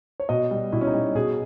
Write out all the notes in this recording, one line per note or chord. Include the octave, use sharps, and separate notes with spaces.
C#5
B2 D#5
G3
B2 E4
C#4
D#4
G3
B2 G#4